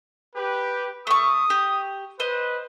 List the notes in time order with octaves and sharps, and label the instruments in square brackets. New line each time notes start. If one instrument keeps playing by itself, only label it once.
[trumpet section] G4 B4
[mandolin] A3 C#6 [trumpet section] D#6
[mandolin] G4
[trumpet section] B4 [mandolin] C5 D#5